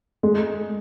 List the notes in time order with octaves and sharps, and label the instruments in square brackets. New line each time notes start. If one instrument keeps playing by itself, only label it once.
[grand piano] G#3